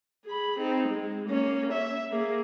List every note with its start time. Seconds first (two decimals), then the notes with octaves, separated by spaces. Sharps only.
0.26 G#4 B5
0.59 C4 D#4
0.88 G#3
1.29 A#3 C#4
1.72 E5
2.12 A#3 G#4